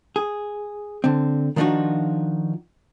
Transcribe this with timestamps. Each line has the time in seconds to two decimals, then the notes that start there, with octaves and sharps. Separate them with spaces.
0.16 G#4
1.04 D3 C4
1.56 D#3 F3 D4 D#4 F4 F#4